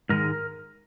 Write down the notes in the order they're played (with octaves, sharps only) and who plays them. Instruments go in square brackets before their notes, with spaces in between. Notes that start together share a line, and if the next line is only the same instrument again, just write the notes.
[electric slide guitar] G#2 D#3 G#3 A#4